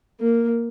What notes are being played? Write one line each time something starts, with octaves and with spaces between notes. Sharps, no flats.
A#3